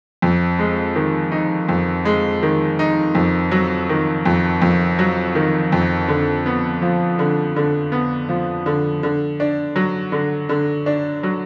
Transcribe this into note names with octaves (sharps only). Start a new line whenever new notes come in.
F2
G#3
D#3
D#4
F2
G#3
D#3
D#4
F2
F#3
D#3
F2
F2
F#3
D#3
F2
D3
B3
F3
D3
D3
B3
F3
D3
D3
D4
F#3
D3
D3
D4
F#3